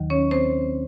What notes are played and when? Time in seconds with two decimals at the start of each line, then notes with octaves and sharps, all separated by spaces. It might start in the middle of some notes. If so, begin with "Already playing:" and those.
Already playing: D#2 D#3 F#3
0.10 C#4 C#5
0.31 C4 C5